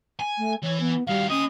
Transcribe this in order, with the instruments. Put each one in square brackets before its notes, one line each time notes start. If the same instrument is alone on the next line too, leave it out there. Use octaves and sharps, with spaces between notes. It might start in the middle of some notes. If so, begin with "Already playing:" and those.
[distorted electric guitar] G#5
[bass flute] A3
[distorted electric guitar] E3 B4 [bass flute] C#5
[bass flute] B3
[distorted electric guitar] D#3 F#4 [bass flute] G3 [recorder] F5
[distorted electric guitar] A#3 D#5 [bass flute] C#4 [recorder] D#6